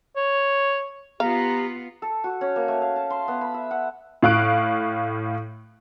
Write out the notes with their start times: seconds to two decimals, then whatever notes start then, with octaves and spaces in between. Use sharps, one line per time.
0.16 C#5
1.20 B3 F4 G4 F5 A#5
2.02 A4
2.24 F#4
2.41 C#4
2.56 A#3
2.68 A3
2.82 F5
2.96 A5
3.10 C6
3.28 B3
3.41 B5
3.54 E5
3.71 F#5
4.23 A2 F5 F#6 D7